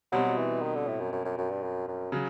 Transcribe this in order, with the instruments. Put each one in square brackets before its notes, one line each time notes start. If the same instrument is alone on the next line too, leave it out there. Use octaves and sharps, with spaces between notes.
[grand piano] B2 G3 C4 D#4 [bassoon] F#3
[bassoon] E3
D#3
D3
A2
F#2
F#2
F#2
F#2
G2
F#2
F#2
[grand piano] C#3 F#3